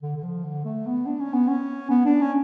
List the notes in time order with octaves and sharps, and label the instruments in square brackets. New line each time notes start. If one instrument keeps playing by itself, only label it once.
[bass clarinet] D3
D3
F3
D3
A3
B3
D4
C#4
B3
C#4
B3
D4
C#4